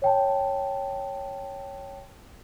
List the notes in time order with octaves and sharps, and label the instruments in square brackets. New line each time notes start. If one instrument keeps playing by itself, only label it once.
[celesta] C#5 G5 A5